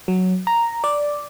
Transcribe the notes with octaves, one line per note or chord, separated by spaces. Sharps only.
F#3
A#5
D5